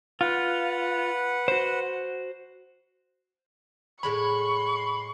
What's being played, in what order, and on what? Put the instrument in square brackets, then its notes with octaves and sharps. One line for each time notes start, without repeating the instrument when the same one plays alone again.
[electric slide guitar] F4 [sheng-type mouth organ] B4 F#5
[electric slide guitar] F#4 C5
[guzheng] A2 G#3 C#5 [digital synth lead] B5 [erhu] C#6